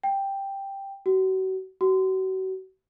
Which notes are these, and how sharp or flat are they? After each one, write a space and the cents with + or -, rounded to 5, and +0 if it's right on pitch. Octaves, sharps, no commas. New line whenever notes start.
G5 +5
F#4 +35
F#4 +35